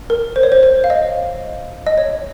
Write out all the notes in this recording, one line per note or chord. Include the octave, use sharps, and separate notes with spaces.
A#4
C5
C#5
C5
C5
F5
D#5
D#5
C#5